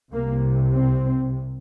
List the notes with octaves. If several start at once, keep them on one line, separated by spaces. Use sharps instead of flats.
C2 C3 A#3
C4